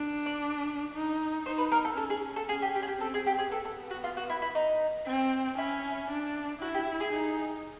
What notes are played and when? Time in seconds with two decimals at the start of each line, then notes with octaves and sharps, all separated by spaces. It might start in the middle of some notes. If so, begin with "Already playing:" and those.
Already playing: D4
0.26 D5
0.94 D#4
1.46 D#4 C5
1.58 B4
1.72 A#4
1.85 A4
1.97 C#4 A4
2.10 G#4
2.36 A4
2.49 C#4 G#4
2.62 G4
2.75 G4
2.83 G#4
2.88 G4
3.00 C4 A4
3.14 G#4
3.26 G4
3.39 G#4
3.52 B3 A4
3.65 A4
3.91 F#4
4.04 F4
4.17 F#4
4.30 E4
4.42 E4
4.55 D#4
5.06 C4
5.58 C#4 E4
6.10 D4
6.61 E4 F#4
6.74 G4
7.00 G#4
7.13 D#4